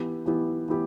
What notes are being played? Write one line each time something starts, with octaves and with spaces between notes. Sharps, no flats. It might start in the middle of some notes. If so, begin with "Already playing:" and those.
Already playing: E3 B3 E4 G4
E3 B3 E4 G4
E3 B3 E4 G4